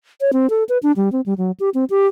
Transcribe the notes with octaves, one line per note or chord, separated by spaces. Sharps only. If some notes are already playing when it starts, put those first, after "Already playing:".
C#5
C4
A4
B4
D4
G3
C4
G3
F#3
G4
C4
G4